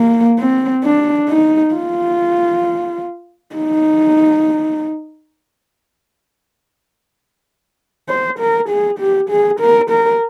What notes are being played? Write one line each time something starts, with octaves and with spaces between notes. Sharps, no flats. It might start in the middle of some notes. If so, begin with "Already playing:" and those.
Already playing: A#3
C4
D4
D#4
F4
D#4
C5
A#4
G#4
G4
G#4
A#4
A#4